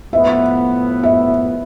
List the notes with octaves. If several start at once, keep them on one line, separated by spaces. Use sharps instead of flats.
A2 F3 B3 E5
E5